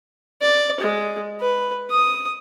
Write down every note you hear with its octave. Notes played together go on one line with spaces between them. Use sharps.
D5
G#3
B4
D#6